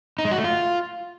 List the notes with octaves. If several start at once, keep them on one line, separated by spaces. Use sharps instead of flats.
D#4
G#3
F#4
A3
F4